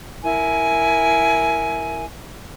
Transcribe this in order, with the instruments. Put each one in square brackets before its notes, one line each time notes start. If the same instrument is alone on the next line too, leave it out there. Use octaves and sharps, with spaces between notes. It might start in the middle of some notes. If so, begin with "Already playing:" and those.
[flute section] E4 A#4 G#5